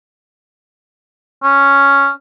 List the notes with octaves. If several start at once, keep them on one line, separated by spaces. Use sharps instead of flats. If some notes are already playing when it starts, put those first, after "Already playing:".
C#4